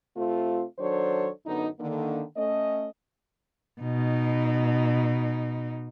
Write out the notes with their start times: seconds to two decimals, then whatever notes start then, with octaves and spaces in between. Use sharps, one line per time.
0.16 C3 A3 C4 F4
0.78 D#3 F#3 D4 A4 C5 C#5
1.46 F#2 D3 B3 D#4
1.80 D3 D#3 A#3
2.36 A3 C#4 D#5
3.81 B2 D#4